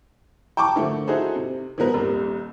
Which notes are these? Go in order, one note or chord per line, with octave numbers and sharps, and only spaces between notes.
G5 A5 C#6 D6
D3 D#3 F3 A3
D#4 E4 F#4 G#4 A4 C5
C3
D#3 F3 B3 A#4
D#1 C2